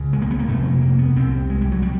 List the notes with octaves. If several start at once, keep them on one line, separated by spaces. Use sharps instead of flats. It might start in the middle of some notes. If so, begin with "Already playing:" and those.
Already playing: C#2 C#3
G#3
A#3
B3
A#3
F2 C3 A3
A#3
A#3
B3
C2 C3 C4
G#3
G3
F#3
G3